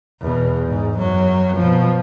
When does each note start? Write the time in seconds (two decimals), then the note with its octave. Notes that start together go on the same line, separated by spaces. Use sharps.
0.20 E2 B2
0.68 G#2
0.98 F#2 F#3
1.57 B2 F3